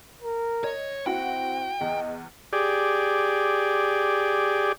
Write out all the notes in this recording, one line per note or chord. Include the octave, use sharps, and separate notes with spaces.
A#4
C#5 D#5
C4 E4 F#4 F#5 G5
E2 D#5
G4 G#4 D5